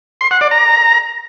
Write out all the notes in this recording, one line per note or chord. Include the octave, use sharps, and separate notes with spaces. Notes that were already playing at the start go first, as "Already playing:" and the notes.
C6
F#5
D5
A#5